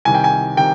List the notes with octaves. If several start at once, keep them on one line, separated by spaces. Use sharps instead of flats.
C2 C3 D#3 G#5
G5
G#5
C3 D#3 G5